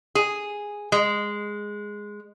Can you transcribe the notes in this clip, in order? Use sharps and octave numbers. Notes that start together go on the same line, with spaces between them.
G#4
G#3